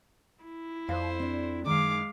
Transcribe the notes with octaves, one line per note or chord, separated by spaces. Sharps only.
E4
F2 C5 F5
C4 D4
F#2 D#3 G#3 F5 D6